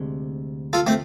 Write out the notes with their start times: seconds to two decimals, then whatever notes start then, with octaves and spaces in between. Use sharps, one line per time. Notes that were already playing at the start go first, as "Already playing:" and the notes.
Already playing: D2 C3 G#3
0.73 F4 A4
0.87 A3 C4